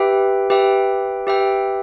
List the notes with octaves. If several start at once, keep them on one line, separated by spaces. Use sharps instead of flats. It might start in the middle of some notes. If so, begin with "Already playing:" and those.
Already playing: G4 B4 E5 G5
G4 B4 E5 G5
G4 B4 E5 G5